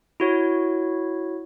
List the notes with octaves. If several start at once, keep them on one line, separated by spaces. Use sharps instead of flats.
E4 F#4 C#5